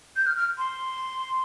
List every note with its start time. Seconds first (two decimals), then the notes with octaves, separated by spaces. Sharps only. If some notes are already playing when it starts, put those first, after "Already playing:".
0.16 G6
0.27 F6
0.37 F6
0.58 C6